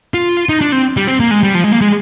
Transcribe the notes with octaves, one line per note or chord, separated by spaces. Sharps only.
F4
D#4
D4
C4
G3
C4
A#3
G#3
G3
F3
G#3
A#3
G#3